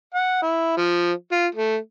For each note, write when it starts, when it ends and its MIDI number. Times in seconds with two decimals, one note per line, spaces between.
0.14 0.39 78
0.42 0.72 64
0.77 1.12 53
1.32 1.46 65
1.55 1.77 57